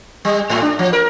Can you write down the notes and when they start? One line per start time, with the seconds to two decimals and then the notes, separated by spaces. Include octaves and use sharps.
0.25 G3
0.49 G#2
0.62 D4
0.79 F3
0.93 A#4